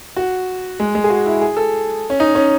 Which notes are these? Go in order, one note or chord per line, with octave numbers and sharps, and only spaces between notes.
F#4
G#3
G#3
G#4
F#4
E4
G#4
A4
C#4
D#4
C#4